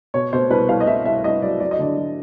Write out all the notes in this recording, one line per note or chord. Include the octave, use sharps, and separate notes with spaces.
B2 C#5
B2 C5
C2 B4
C2 F5
D#5
C2 E5
C2 E5
C2 D#5
F#3 D5
F#3 D5
D#5
D3 D5
F#3